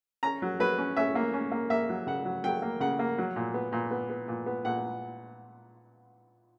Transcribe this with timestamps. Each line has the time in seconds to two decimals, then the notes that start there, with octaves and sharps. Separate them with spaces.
0.23 C#4 A#5
0.42 F#3
0.60 F#3 B4
0.78 C#4
0.96 C#4 E5
1.15 A#3
1.34 C#4
1.52 A#3
1.70 A#3 E5
1.89 F#3
2.07 C#3 F#5
2.25 F#3
2.44 F#3 G5
2.62 A#3
2.80 C#3 F#5
2.99 A#3
3.18 F#3
3.36 A#2
3.54 B3
3.72 A#2
3.91 B3
4.10 B3
4.28 A#2
4.46 B3
4.65 A#2 F#5